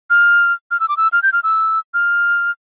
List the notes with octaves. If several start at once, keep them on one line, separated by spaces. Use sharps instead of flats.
F6
F6
E6
D6
E6
F6
G6
F6
E6
F6